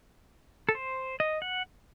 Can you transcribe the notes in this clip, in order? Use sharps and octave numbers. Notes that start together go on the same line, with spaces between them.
A4
C5
D#5
F#5